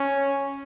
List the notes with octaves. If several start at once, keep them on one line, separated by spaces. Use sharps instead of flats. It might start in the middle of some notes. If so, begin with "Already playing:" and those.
Already playing: C#4